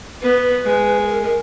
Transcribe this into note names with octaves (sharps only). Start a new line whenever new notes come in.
B3 B4
G#3
B4
A#4
A#4